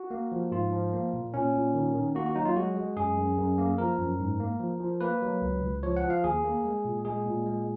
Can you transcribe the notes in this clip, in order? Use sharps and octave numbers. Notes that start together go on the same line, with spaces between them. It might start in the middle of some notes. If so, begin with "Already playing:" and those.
Already playing: F#4
A#3
F3
G#2 F4
F3
A#3
A#2
A#2 C#4
A#2
D#3
D#3
A#3 F#4
F#4
F#3 D#4
F4
G#3 F#4
G#3
F#2 G#4
F#2
F#2
A#3
F3 A#4
F#2
G#2
A#3
F3
F3
A#3 B4
F#3
C#2
C#2
F3 C#5
F#5
F3
F5
D#2 G#4
A#3
G#3
A#2
G#3 G#4
A#2
G#3